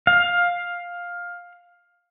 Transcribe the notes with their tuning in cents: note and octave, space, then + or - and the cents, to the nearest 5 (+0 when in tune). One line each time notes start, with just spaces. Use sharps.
F5 +10